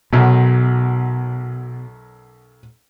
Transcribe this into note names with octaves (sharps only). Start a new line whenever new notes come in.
B1 F#2 B2